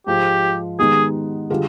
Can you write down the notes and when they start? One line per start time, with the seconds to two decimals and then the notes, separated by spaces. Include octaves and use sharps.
0.07 G#2 F3 G#3 G4
0.79 D#3 G#3 B3 D#4 G4 G#4
1.50 D3 G3 D4 F4 G#4